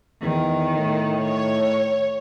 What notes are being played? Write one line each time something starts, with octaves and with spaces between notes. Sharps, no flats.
E2 D#3
A2
C#5